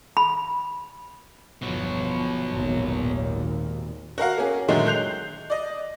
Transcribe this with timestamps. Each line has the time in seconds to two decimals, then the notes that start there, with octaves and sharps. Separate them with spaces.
0.17 B5
1.62 G1 E2 B2 F3 F#3
2.52 G#1 D#2 A#2
4.18 F#4 A#4 F5 F#5
4.38 A#3 C#4 G#4
4.68 A#2 D3 D#3 F#3 G#3 A3
4.87 F#6 G6 C7 F7
5.50 D5 D#5